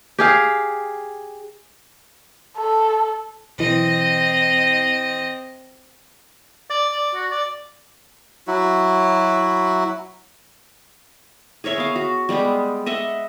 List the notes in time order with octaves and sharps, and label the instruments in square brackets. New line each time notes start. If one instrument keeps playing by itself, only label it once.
[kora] G4 G#4 F5
[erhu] A4
[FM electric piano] B1 E3 [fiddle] C4 D#5
[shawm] D5
D5
F#4
D5
[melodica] F#3 E4 F#4
[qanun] G#4 A#4 C#5 E5
B3 F5
F#4
G3 G#3 B3 G4
D#5 E5 F#5